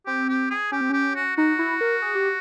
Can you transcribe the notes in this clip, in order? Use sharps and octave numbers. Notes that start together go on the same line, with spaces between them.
C4 G4
G4
G#4
C#4 G4
C4
C#4 G4
F#4
D#4 F#4
E4
A#4
G#4
G4